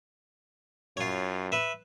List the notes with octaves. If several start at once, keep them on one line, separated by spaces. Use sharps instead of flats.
F#2 F4 C#5
B4 E5